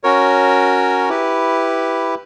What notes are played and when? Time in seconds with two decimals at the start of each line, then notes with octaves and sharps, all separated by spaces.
0.03 C#4 F#4 A#4 C#5
1.09 E4 G4 B4